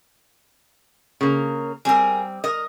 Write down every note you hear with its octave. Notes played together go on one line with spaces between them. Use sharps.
C#3 A#3
G3 C4 G#4 A#4
A#4 D#5